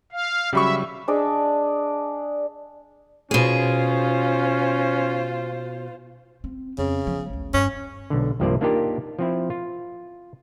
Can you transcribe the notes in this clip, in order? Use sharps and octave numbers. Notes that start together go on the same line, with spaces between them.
F5
C#3 F#3 G3 E5 B5 C#6
D4 G#4 D5 D#5
B2 C#4 F4 G#4 C5
C4
F2 C#3
F3 B3
A1 D2
G2 C#4
B1 D3
C2 G2 F3 A#3 C5 D5
A#3 D4 D#4 F4 G4 A#4
F3 C4 E4
F4